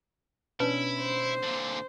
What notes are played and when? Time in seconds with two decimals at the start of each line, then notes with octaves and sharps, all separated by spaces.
0.60 B2 C#4 D4 E4 B4 C#5 A5
1.01 C5
1.43 A#2 D3